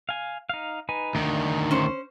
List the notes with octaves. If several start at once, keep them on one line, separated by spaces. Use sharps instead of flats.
F5 G#5
D#4 F5
D#4 B4 G#5
D2 D#3 D4 D#4
C#4 C5